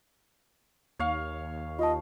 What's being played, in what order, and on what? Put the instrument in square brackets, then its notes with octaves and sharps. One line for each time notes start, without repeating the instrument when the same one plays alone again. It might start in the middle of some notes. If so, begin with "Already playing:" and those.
[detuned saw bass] D#2 [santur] C#5 F5
[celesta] F4 A5 [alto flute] D#5